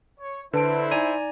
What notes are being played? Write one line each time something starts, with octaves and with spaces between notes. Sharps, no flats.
C#5
D3 E4 B4 C5 A5 D7
D#4 D5 G#5 A#5 G#6 D#7